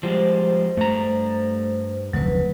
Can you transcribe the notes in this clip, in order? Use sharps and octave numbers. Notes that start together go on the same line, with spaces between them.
F3 G3 G#3 C5
G2 A3 A#5
F1 D2 F#3 B4